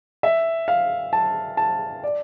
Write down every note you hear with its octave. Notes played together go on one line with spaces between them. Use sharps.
E5
F5
A5
A5
D5